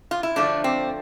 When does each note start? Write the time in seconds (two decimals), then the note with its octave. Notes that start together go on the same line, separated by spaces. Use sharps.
0.11 F4
0.23 E4
0.36 D3 F3 A3 D4
0.64 C4